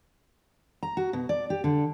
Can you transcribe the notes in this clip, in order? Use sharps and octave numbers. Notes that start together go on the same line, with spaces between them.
A#5
F#4
B2
D5
G4
D3